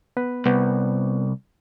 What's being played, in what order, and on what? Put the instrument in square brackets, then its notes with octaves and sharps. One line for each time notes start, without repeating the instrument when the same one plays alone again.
[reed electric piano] B3 B4
[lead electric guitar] C2 [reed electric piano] B3